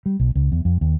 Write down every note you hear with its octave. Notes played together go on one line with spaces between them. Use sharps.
G3
B1
C#2
E2
F2
D#2